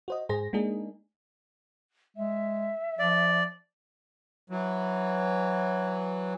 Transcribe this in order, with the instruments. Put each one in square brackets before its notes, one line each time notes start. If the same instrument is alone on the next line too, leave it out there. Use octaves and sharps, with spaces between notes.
[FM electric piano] F#4 C5 D#5
G#2 G#4 C5 A#6
G#3 A#3 D4 D#4 G#4
[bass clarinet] G#3 [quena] E5
[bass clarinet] F3 [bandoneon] D5
[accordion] E3 F#3